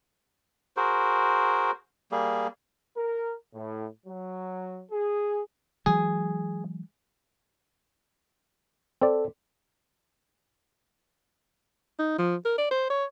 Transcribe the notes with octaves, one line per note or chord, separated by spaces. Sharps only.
F#4 G#4 A#4 C5
G3 A#3 G#4
A#4
A2
F#3
G#4
E3 F#3 G#3 G#4
C4 A4 D5
D#4
F3
A#4
D5
C5
C#5